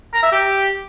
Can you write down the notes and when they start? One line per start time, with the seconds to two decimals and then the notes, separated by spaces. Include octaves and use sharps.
0.13 A#5
0.23 E5
0.32 G4